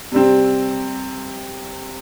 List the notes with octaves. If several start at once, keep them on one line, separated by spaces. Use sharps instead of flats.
C3 G3 C4